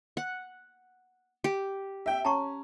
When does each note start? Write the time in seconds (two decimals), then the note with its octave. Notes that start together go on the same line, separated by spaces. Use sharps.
0.17 F#5
1.44 G4
2.06 E5 G5
2.25 C#4 A5 A#5 C#6